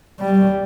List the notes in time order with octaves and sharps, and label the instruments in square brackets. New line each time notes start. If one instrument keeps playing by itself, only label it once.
[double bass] G3